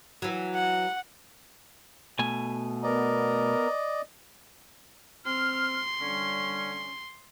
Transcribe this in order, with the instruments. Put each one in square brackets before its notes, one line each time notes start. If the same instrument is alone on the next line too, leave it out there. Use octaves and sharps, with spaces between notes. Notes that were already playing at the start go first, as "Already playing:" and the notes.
[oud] E3 F#3
[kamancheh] F#5
[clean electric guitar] B2 A3 G#5
[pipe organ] B3 A#4 [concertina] D5 D#5
[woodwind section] C4 F6 [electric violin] C6
[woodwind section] D3 G3 C#4